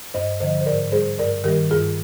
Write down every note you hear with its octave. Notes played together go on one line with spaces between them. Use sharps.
G2 C5 D#5
D3 F3 C5 D#5
C5
G#2 A#4 D5
G3 G#4 C5
G2 A#4 D5
D#3 G3 G4 A#4
G2 F4 G#4